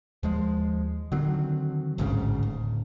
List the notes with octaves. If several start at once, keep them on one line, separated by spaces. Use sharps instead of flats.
D#2 F3 G#3
D3 D#3 F#3 C4
A1 D2 G#2 C#3
D1